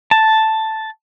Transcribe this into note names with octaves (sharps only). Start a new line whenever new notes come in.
A5